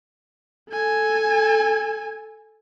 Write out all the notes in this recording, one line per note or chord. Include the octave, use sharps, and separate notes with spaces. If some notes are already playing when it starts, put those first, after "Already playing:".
A4 G#5